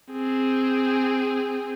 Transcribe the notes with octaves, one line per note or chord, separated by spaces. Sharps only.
C4 G#4